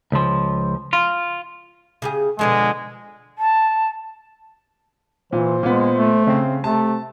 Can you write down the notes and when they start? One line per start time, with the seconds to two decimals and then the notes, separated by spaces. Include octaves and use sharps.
0.12 C#2 F3
0.93 F4
2.02 C#3 G4 G#4
2.39 B2 D3 F3 G#3
3.38 A5
5.32 A#2 E3 C5
5.63 A#2 G#3 B3
5.95 A3
6.27 C#3 C4
6.64 C3 A3 A5